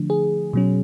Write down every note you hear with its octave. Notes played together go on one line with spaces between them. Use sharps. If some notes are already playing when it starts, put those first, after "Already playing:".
Already playing: D3 F3 A3 D4
G#4
B2 F#3 C#4